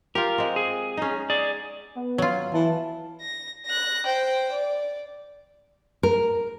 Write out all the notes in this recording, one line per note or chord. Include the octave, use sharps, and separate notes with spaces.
F4 G4 A#4
G#3 C4
G#4
C#4 D#4
G#4 D5
B3
F#3 F4
E3 A5
A#6
F#6 A#6
C5 G5
D5
A#4